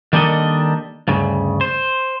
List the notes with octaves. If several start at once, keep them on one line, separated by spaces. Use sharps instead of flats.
D#3 G3 A#3 D4 A4 D#5
D2 G2 C#3
C5